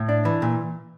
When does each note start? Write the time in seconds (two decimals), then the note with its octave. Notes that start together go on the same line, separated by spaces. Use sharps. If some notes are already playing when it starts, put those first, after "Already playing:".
Already playing: A2
0.09 D4
0.25 E3
0.42 A#2